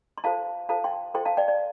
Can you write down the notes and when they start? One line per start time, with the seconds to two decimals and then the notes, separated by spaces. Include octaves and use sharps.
0.18 C6
0.24 F4 A4 C5 F5 A5
0.69 F4 A4 C5 F5 A5
0.84 G5 C6
1.14 F4 A4 C5 G5 C6
1.25 F5 A5
1.37 D5 G5
1.48 D5